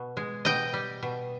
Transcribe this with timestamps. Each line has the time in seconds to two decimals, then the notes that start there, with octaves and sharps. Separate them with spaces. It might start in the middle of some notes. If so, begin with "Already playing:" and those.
Already playing: B2
0.17 G#3
0.45 B2 D#5 G5
0.73 G3
1.03 B2